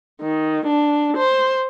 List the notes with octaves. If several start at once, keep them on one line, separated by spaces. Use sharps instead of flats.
D#3
D4
C5